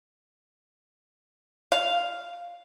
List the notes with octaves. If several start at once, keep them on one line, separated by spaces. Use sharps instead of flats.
F5